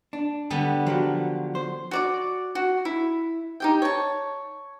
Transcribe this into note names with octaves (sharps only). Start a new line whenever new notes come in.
D4
D3 G3 B3
F3 F#3 F#4 G4
C5
F#4 D5 D6
F#4
E4
D#4 G4 G5
C#5 A5